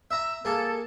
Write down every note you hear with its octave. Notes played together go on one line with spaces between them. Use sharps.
E5 A#5 E6
A#3 G#4 A4